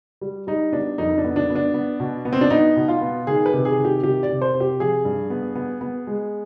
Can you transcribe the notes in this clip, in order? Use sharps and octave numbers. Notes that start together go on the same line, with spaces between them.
G3
G3 D#4
B3 D4
F2 D#4
D4
B3
D4
B3
D4
B3
B2
B3
C4
D4
B3 D#4
B2
F4
B3
D#3 G#4
B4
C3
G#4
D#3
G4
C3 G4
D5
C3
C5
C3
G4
F3 G#4
G2
B3
B3
B3
G#3